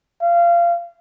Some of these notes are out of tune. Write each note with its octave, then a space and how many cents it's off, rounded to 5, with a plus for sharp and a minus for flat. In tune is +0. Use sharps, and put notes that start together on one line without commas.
F5 -25